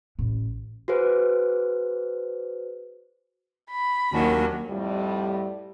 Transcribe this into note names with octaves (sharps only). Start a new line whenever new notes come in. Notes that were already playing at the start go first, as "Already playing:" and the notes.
A1
F#4 G#4 B4 C5
B5
D#2 D#3 F#3 A#3 C#4 D4 F#4
F2 A2 G3